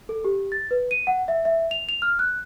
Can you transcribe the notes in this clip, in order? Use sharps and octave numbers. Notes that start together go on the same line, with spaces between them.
A4
G4
A6
B4
D#7
F#5
E5
E5
F7
F7
F6
F#6